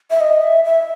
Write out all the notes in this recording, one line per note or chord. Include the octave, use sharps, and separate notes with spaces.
E5
D#5
E5
E5